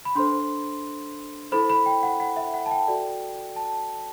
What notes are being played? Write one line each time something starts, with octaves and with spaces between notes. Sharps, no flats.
B5
D4 A4 C5 C6
E4 A4 C5 B5
B5
G5
F#5
F#5
E5
F#5
A5
G5
F#4 A4 D5
A5